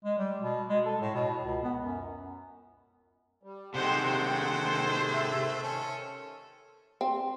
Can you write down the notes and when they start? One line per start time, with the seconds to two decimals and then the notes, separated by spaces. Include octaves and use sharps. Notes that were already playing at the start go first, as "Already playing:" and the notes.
0.05 G#3
0.18 G3
0.40 B2
0.69 G#3
0.86 A4
1.01 A2
1.15 B2
1.44 C#2
1.63 B3
1.82 F#2
3.43 G3
3.75 C3 D#3 G#3 A3 C4 C5 F#5 G5
4.28 C5
5.13 E5 E6
5.63 D#3 C#4 A4
7.01 C4